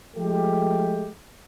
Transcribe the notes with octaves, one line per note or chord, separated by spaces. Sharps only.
F3 G#3 A3 G4